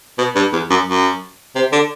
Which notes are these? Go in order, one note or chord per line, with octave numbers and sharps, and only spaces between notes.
B2
G2
E2
F#2
F#2
C3
D3